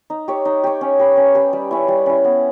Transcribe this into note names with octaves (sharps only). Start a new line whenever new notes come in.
D#4
G4 C#5
D#4
G4 C#5
C#4
G4 B4
C#4
G4 B4
G3
C#4 E4
G3
C#4 E4
B3